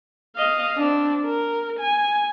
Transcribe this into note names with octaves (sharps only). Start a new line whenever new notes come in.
D#5 F5
C4 D4
A#4
G#5